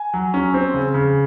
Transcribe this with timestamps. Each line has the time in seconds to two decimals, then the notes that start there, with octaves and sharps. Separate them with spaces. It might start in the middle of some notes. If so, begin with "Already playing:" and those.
Already playing: G#5
0.14 F#3
0.34 C#4
0.54 C4
0.74 C#3
0.94 C#3